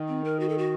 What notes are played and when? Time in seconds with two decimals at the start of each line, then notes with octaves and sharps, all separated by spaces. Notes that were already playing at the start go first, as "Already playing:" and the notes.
Already playing: D#3
0.08 C4
0.24 A#4
0.40 F#4
0.49 A4
0.58 F#4